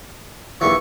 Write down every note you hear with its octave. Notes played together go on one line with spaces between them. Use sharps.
A#1 D#2 E3 C#6